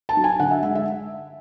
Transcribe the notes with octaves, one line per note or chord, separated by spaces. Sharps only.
A5
F#3
G#5
D3 F#5
E5
G#3 E5
E5